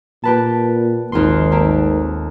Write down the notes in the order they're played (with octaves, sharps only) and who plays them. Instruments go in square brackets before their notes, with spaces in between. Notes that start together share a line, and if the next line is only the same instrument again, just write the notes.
[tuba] A#2 [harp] G4 B4 A5
[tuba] G#1 [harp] D#2 F4 C6
[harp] A3 A#3 G4